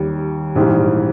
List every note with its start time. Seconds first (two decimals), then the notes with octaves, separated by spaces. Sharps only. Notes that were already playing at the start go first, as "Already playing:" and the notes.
Already playing: D#2 D#3 G3
0.56 A#1 G#2 E3 G3